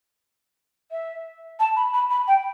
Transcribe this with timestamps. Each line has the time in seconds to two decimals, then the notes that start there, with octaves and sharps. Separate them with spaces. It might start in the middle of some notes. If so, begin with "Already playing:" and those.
0.91 E5
1.59 A5
1.76 B5
1.94 B5
2.10 B5
2.28 G5